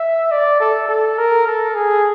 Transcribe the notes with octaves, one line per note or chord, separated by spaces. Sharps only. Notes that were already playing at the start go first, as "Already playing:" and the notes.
Already playing: E5
D5
A4
A4
A#4
A4
G#4